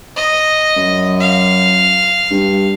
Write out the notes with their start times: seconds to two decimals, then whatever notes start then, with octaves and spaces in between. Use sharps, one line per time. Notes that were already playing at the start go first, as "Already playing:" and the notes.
0.16 D#5
0.77 F#2
1.20 F5
2.31 G2